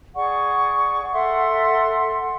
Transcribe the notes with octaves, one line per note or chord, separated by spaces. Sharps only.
G#4 D5 F#5 C#6
A4 E5 F#5 C6